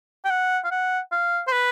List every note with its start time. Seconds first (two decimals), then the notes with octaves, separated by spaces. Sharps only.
0.25 G5
0.30 F#5
0.65 F5
0.71 F#5
1.12 F5
1.47 C5
1.52 B4